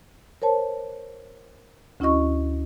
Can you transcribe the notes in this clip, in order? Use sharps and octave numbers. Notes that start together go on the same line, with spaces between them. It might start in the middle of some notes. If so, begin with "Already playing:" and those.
A#4 C5 C#5 A5
D2 C#4 E4 F#4 D#5 C#6